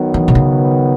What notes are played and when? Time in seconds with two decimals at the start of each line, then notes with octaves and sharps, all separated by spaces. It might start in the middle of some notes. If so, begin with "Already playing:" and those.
Already playing: D#3 F#3 B3
0.14 E3
0.28 C3
0.35 C#3